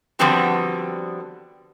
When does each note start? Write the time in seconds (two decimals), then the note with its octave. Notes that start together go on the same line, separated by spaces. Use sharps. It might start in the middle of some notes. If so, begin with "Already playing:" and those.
0.19 D3 F3 G3 B3 C4 F#4